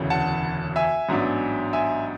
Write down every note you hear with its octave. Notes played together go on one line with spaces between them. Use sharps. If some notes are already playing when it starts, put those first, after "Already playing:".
Already playing: E1 D2 C#3 E3
F#5 A5
E5 G#5
A1 G#2 F#3 B3 D4
E5 G#5